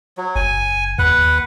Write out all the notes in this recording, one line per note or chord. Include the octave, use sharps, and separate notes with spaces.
F#3
F#1 G#5
D#2 B4 F#5